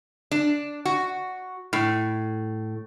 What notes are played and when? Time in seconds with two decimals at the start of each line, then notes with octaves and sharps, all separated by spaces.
0.31 D4
0.85 F#4
1.73 A2